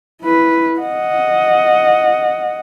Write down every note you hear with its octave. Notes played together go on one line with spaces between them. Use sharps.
E4 B4
D#5 F#5